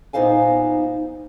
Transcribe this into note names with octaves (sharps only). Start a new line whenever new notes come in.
A#2 B3 D#4 C5 F5 G#5